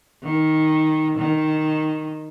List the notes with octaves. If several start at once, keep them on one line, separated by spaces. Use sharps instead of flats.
D#3
D#3